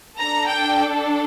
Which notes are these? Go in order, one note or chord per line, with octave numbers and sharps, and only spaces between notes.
D4 A4 A#5
G5